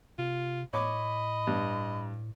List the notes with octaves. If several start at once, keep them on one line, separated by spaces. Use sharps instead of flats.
C3 F4
A2 C#5 D#5 B5 D6
G2